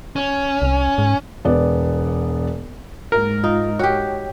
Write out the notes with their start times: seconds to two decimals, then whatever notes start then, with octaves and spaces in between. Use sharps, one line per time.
0.16 C#4
0.62 C2
0.98 G#2
1.45 E1 B3 D5
3.12 G#2 A#4
3.44 D#4 F4
3.79 F#4 G4 C#5 G5